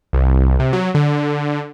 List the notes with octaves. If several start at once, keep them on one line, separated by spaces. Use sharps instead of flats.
C2
C3
F#3
D3